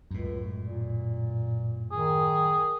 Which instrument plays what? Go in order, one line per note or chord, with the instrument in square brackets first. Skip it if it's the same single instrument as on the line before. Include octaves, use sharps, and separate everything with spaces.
[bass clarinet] C#2 [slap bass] F#2 A2
[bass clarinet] A#2
[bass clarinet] D#3 [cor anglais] G#4